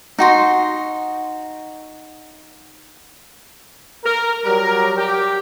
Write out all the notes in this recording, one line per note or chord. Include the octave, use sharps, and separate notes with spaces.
D#4 F#4 C6
A#4
F#3 G3 G4 A#4
G4